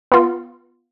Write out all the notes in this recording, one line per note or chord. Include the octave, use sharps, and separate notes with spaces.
B3 F4